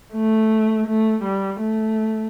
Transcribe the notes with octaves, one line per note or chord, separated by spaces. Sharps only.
A3
A3
G3
A3